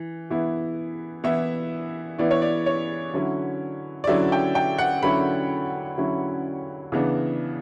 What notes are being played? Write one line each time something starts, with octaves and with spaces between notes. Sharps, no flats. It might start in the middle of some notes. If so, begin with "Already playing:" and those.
Already playing: E3
E3 B3 E4
E3 B3 E4 E5
E3 B3 E4 D5
C#5
D5
C#5
D3 F#3 C#4 E4
D5
D3 F#3 C#4 E4 E5
G5
G5
F#5
D3 F#3 C#4 E4 B5
D3 F#3 C#4 E4
C#3 E3 B3 D4